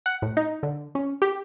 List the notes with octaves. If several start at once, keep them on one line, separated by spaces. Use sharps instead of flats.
F#5
A2
D#4
D3
C#4
G4